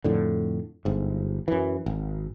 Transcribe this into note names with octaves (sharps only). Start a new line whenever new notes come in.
F2 A2 D3
G1 G#2
F#2 E3
G#1